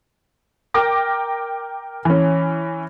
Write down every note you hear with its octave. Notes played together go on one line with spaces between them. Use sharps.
A#4 G5 D6 A#6
E3 C#4